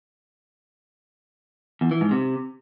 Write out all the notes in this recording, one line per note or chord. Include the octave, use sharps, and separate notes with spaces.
E2
E3
G#2
C3